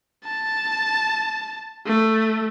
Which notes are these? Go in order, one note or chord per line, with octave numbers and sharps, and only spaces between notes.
A5
A3